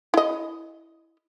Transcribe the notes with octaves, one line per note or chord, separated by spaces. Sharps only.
E4 D#5